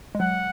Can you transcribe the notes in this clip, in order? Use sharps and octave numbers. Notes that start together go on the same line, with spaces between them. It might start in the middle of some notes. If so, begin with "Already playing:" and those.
G#3
F#3 F#5